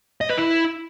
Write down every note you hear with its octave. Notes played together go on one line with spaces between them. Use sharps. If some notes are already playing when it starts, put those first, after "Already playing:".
D#5
B4
E4